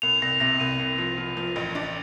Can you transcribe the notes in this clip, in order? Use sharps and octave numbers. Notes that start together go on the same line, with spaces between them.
C2 F7
C2 A#6
C3 A#6
C2 D#7
C2
F3
F3
F3
A1
D4